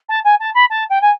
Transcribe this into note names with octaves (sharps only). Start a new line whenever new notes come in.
A5
G#5
A5
B5
A5
G5
G#5